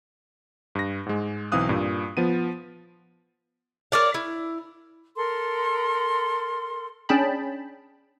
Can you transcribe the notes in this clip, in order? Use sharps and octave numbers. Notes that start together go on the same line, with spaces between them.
G2 A#6
G#2 G#3
B1 E3 C4 F5 D#6 F#6
G2 A#2
F3 B3 D#7
A#4 C#5 D5 F5
E4
A4 A#4 C6
C#4 D4 G#4 G5 A5 B5